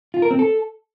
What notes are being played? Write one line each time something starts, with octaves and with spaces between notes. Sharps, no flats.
F4
A#4
C4
A4